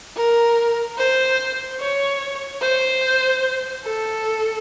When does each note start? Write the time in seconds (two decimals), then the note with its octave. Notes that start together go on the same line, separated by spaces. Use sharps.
0.16 A#4
0.98 C5
1.80 C#5
2.62 C5
3.85 A4